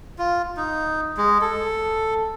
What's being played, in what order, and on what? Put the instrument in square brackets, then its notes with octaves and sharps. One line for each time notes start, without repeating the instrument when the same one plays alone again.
[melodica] F4
D#4
G#3
A4